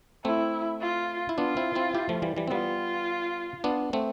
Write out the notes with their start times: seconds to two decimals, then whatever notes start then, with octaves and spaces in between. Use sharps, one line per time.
0.25 A3 C4 E4
0.81 F4
1.29 E4
1.38 B3 D4 F4
1.57 C4 E4
1.75 C4 E4
1.95 E4 G4
2.09 F3 A3
2.22 E3 G3
2.36 E3 G3
2.47 C4
2.51 G3 B3 F4
3.64 B3 D4
3.93 A3 C4